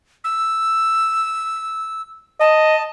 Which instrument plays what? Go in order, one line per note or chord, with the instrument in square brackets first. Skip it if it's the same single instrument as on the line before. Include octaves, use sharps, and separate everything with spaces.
[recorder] E6
[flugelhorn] D#5 [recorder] A5